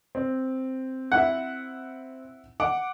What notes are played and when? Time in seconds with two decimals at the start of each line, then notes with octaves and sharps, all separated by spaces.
0.15 C4
1.12 E4 F#5
2.60 F#5 D6